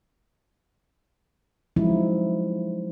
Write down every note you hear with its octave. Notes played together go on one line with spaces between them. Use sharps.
F3 F#3 G#3 C#4 D#4 E4